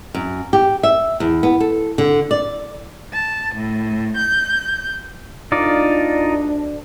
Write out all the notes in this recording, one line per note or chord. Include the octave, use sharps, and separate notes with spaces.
F#2
G4
E5
E2
B3
A4
D3
D5
A5
A2
G6
D2 D4 D#4 F4 D5